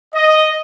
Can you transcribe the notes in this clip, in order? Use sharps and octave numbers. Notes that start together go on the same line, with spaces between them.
D#5